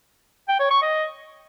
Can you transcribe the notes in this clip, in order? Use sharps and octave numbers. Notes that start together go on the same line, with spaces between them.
G5
C#5
C#6
D#5